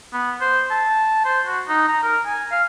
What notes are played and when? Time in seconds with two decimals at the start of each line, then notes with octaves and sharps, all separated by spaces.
0.13 B3
0.41 C5
0.70 A5
1.25 C5
1.47 F#4
1.69 D#4
1.88 A#5
2.03 A#4
2.25 G#5
2.51 F5